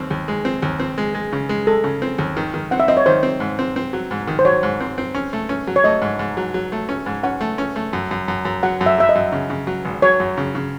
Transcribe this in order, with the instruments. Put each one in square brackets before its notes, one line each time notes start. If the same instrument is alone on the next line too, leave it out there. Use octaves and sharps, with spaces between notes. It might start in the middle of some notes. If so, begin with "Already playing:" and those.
Already playing: [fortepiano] D#2 C4
D#2
G#3
C4
D#2
C4
G#3
G#3
C#3
G#3
[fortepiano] G#3 [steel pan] A4
[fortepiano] C#3
C4
D#2
D#3
D#3
[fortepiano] C4 [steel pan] F#5
[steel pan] E5
[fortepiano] C4 [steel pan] D#5
[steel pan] C#5
[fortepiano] D#3 [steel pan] C5
[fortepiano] C4
G#2
C4
C4
F#3
G#2
D#3
[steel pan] C5
[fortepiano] F#3 [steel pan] C#5
[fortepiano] G#2
C4
C4
C#4
A3
C#4
F#3
[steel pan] C#5
[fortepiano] A3 [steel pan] D#5
[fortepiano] G#2
G#2
F#3
F#3
A3
C#4
G#2
[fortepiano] C#4 [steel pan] F#5
[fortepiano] A3
C#4
A3
F#2
F#2
F#2
F#2
[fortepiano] F#3 [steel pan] F#5
[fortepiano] F#2
[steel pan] E5
[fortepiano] F#3 [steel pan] E5
[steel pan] D#5
[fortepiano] F#2
C#3
C#3
F#3
G#1
[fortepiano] F#3 [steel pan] C#5
[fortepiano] F#2
C#3
C#3